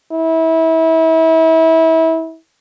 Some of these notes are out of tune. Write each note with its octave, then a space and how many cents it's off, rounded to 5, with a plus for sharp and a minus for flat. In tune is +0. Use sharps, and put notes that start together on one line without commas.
E4 -30